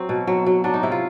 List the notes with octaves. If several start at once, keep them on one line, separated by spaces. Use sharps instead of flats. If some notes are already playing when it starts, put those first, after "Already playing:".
Already playing: F#3 C4
B2
F#3
F#3
F#3 D4
D#4
C3 E4
F4